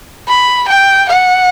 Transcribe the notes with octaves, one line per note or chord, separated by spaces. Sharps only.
B5
G5
F#5